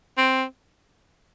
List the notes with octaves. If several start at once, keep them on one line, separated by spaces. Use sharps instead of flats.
C4